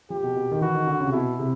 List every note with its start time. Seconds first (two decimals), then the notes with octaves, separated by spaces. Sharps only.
0.10 F3 G4
0.23 B2
0.36 B2
0.51 D#3
0.61 E3 F#4
0.75 D#3
0.87 D3
1.00 C#3
1.06 C3
1.12 B2 E4
1.39 C3